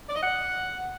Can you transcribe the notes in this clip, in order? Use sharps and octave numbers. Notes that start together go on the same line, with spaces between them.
D5
D#5
F#5